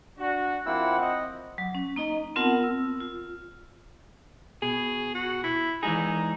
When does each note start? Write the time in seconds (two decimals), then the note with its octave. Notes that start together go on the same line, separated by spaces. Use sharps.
0.19 D4 F#4
0.66 F3 A#3 C4 E4 F#5 E6
1.01 D#5
1.58 F#3
1.75 C#4
1.96 A#3 D#4 D#5 A#5
2.36 B3 C4 F4 A#4 F#5 A5
2.63 E6
3.00 F4
4.62 B2 G#4
5.15 F#4
5.43 E4
5.83 E3 G#3 D#4 G#4